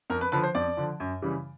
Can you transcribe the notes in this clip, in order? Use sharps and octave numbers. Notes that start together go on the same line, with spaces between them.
F2 A#4
B4
D3 F3 B4
C5
F2 D5
D3 F3
F#2
C#3 E3 G3